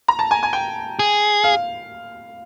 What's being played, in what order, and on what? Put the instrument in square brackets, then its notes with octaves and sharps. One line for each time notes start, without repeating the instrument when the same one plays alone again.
[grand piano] A#5
A5
G#5
G#5
G5
[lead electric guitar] G#4
[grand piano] F5